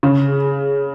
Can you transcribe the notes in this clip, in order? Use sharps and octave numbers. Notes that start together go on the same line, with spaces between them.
C#3